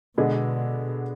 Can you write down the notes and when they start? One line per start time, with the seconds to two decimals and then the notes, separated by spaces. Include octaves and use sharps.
0.18 B2 D3 G#3 B3